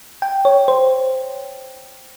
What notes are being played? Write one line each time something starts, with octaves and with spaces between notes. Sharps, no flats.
G5
C#5
C5